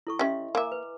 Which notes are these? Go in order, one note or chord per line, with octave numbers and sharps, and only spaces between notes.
E4 A4 C#6
C#4 G4 D#5 E5 C6
A#3 E5 G#5 A#5 D6
B4